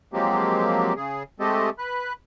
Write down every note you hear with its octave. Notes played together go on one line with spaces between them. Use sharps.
F3 F#3 G#3 A#3 C4 G4
C#3 G#4
G#3 A3 C4 G4 A4 D#5
B4 F#6